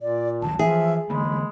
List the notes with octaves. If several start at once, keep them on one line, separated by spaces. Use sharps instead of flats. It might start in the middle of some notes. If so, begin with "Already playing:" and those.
A#2 D5
C#2 D#3 F#3 A5
E3 F3 G#4 E5
D3 E3 G#3 A#3 B5